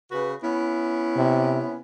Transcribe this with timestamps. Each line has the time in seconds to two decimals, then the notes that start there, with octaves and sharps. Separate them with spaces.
0.11 C#3 F#4 B4
0.43 B3 C#4 E4
1.17 C3